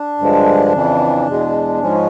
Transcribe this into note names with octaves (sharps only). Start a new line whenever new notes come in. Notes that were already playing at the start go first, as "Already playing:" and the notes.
Already playing: D4
G2 D3 F3 G#3
F2 C#3 E3
E2 B2 G#3
G#2 F3 G#3 C#4